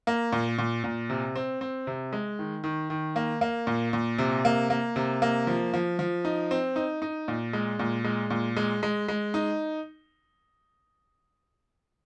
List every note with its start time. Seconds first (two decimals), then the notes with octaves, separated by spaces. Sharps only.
0.07 A#3
0.32 A#2
0.58 A#2
0.84 A#2
1.10 C3
1.36 C4
1.61 C4
1.87 C3
2.13 G#3
2.39 D#3
2.64 D#3
2.90 D#3
3.16 A#3
3.41 A#3
3.67 A#2
3.93 A#2
4.18 C3
4.45 A#3
4.70 A#3
4.96 C3
5.22 A#3
5.47 F3
5.74 F3
5.99 F3
6.25 D#4
6.51 C4
6.76 D#4
7.02 D#4
7.28 A#2
7.53 G#3
7.79 A#2
8.04 G#3
8.30 A#2
8.57 G#3
8.83 G#3
9.08 G#3
9.34 D#4